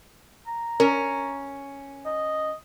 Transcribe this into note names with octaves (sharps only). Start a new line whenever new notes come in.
A#5
C#4 A#4
D#5